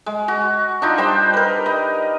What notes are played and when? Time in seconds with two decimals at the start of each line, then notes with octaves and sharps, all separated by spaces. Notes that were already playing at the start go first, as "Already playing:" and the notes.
0.06 G#3
0.28 F#4
0.82 D4 D#4 F4
0.98 G3 C5 G5
1.34 A#4 B4
1.66 D#5